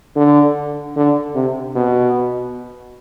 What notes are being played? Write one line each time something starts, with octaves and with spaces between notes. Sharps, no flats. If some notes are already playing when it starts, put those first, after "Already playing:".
D3
D3
C3
B2